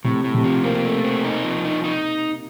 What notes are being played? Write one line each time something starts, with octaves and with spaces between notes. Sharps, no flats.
A2 C3
A2
C3
F3
A#3 C4
A3
C4
D#4
F3
D#4
D#4